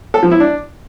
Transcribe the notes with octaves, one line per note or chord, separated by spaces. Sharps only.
A4
F3
E4
D4